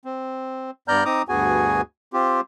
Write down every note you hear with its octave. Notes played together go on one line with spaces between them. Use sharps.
C4
G2 B3 D5 A#5 F6 G6
C4 D#4 A#5 D6 D#6
D2 G2 B3 F#4 G#4 G#5
C4 F4 G4